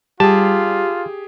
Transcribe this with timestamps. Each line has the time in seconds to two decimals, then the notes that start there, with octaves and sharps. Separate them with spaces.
0.20 G3 F4 G4 G#4 A5